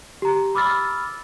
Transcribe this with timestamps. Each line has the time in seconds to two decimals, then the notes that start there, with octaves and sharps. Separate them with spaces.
0.22 G4 A#5
0.55 B5 D6 E6 F6 A6